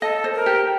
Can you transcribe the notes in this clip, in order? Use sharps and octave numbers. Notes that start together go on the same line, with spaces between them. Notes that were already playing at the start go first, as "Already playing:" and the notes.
A4 D#5
C5
A#4
G4